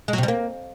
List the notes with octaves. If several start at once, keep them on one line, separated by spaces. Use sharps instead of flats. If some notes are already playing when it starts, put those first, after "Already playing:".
G#3
F#3
C3
G3
A#3